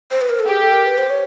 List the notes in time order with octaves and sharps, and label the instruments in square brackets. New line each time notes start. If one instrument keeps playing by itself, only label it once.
[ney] C5
B4
A#4
A4
[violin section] G4 [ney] G#4
[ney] A4
A#4
B4
C5
C#5